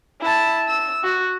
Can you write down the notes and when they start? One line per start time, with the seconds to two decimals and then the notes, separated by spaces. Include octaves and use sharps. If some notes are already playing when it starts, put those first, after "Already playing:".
0.21 E4 A5
0.68 E6
1.04 F#4